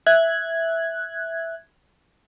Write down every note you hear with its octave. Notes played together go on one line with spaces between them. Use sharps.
E5 F#6 G#6